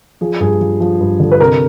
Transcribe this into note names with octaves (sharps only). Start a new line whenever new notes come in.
F3 G#4
G2 G#4
F3
F3
G2
D3
B4
C3 A#4